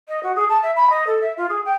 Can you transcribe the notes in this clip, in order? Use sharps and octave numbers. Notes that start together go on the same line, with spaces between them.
D#5
F#4
G#4
A5
E5
B5
D#5
A4
E5
F4
G#4
G5